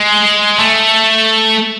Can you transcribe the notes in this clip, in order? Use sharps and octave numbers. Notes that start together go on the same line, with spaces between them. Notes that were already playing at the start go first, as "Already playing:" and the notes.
Already playing: G#3
A3